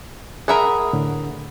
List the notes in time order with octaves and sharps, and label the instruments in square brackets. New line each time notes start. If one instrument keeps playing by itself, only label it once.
[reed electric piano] G#4 B5 D#6 [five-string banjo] A#4 E5 F#5
[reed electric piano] A2 D3